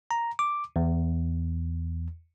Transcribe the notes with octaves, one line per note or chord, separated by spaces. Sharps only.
A#5
D6
E2